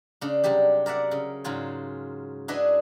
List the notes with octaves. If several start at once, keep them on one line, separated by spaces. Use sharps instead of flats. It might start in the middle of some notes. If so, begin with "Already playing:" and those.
C#3 D4
C3 F#3 G3 G4
A#4 D5 E5 F#5
C#3
G#2 C#3 F#3 F4 G#5
D4 E4 F#4 G#4 B4 D#5